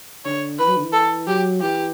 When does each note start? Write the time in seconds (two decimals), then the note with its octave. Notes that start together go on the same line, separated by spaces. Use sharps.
0.25 D3 C#5
0.59 E3 B4
0.67 F#3
0.77 D3
0.85 E3
0.93 A4
1.27 F#3 G4
1.61 E3 G4